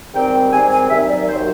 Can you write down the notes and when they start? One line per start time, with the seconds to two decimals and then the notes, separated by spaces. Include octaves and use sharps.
0.14 G#2 D#3 G3 C4 G5
0.52 G#2 D#3 G3 C4 G#5
0.71 G#5
0.89 D#2 D#3 F#3 E5
1.09 D5
1.28 D#2 D#3 F#3 C5